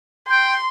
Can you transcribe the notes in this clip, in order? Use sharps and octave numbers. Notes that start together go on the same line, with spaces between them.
G5 C6